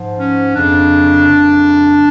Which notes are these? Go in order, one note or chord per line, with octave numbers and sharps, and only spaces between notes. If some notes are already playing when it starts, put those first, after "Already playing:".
Already playing: G#2 F3
C#4
F2 C#3 F3 D4
F2 C#3 F3